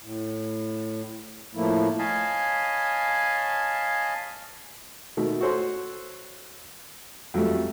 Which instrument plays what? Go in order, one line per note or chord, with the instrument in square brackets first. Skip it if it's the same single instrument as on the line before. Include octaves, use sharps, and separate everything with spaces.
[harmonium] A2
A2 F3 A3 A#3 E4
[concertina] C#5 D#5 F5 G#5 A5 B5
[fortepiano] B2 D#3 A3
F#4 A4 C5 C#5 C6
F2 F#3 G3 A3